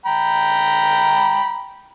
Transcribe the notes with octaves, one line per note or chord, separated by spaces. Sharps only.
G5 A#5 B5